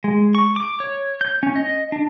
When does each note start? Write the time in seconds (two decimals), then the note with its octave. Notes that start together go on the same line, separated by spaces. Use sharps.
0.04 G#3
0.35 C#6
0.56 D6
0.80 C#5
1.21 G6
1.43 C#4
1.56 D#5
1.92 D4